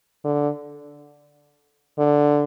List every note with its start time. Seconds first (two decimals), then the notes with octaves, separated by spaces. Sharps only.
0.24 D3
1.99 D3